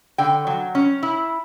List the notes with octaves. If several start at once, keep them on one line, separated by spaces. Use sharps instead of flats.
D3 G5
F#3
C#4
E4